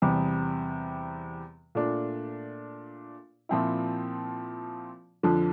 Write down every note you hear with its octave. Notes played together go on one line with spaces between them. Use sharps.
E2 C3 G3
A#2 A3 D4
A#2 F3 C4 E4
F2 D3 F3